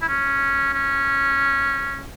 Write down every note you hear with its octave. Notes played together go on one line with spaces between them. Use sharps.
E4
C#4
C#4